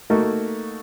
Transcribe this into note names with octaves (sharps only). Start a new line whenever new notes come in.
A3 A#3 D#4 F#4